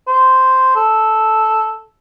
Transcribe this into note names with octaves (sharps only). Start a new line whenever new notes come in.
C5
A4